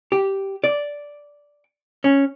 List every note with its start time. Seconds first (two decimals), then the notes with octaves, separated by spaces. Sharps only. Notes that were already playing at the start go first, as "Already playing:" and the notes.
0.12 G4
0.64 D5
2.04 C#4